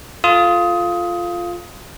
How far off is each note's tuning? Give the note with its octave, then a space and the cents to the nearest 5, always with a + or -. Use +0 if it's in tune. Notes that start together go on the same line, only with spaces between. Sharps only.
F4 +0 A4 -10 D#6 +20